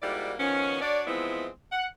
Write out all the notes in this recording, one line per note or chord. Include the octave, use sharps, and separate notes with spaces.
G#2 G3 A#3 E4 F#4 D5
D#3 F3 B3 C#4
D4 F#4 C#5 D5
E3 F3 G#3 B3 C4 E4
F#5